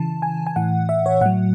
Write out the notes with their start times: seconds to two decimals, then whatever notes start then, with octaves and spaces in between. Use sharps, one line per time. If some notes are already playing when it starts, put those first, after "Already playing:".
Already playing: C#3 E3 A5
0.22 G#5
0.47 G#5
0.56 A2 E3 F#5
0.89 E5
1.06 C#5
1.21 A2 F#3 F#5